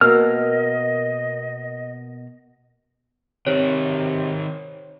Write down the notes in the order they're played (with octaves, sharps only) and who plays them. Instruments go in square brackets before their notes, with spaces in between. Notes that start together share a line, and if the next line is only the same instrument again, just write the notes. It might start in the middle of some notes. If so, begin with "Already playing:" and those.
[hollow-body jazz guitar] B2 A#3 [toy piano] A#4 [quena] D#5 [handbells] F6
[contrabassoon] C3 [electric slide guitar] D#3 C4 [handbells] C5 C#5